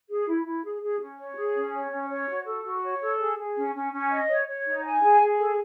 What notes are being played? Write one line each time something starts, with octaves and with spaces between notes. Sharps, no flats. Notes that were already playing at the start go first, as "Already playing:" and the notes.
G#4
E4
E4
G#4
G#4
C#4
C#5
G#4
C#4
C#5
C#4
C#5
F#4
A4
F#4
C#5
A4
G#4
G#4
C#4
C#4
C#4
D#5
C#5
C#5
D#4
G#5
G#4
G#4
A4